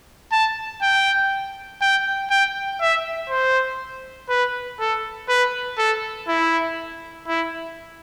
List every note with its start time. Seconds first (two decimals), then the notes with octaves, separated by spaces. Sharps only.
0.32 A5
0.82 G5
1.81 G5
2.30 G5
2.81 E5
3.30 C5
4.29 B4
4.80 A4
5.29 B4
5.78 A4
6.28 E4
7.27 E4